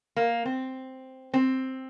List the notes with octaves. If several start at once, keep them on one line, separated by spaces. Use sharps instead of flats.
A#3
C4
C4